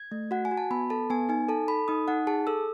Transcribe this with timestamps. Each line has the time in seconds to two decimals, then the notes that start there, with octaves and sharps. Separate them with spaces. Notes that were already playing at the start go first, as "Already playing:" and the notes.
Already playing: G#6
0.12 A3
0.31 F#4 F#5
0.45 G#5
0.51 F#4
0.57 A5
0.71 B3 B5
0.90 A4 A5
1.10 B3 G#5
1.29 D#4 G#5
1.49 A4 A5
1.68 A4 B5
1.88 D#4 D#6
2.08 D#4 F#5
2.27 G#4 A5
2.47 A4 E6